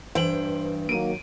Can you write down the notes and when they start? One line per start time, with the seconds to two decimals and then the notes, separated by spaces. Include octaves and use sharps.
0.15 G2 E3 C5 G5 F#7
0.89 D#3 F#3 A#3 D7 D#7